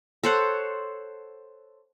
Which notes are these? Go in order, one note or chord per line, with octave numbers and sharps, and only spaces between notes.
A4 C5 C#5 F#5